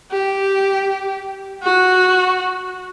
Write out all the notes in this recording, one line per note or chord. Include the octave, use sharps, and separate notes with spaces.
G4
F#4